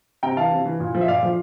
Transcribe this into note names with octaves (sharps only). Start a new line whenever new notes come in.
C3 G5 A#5
E3 F5 A5
C3
E3
A#2
F3
E5
A#2 D5 F5
F3